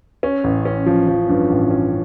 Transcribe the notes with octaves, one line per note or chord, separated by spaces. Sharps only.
C#4
A1
C#4
F3
F3
G2
A1
C#4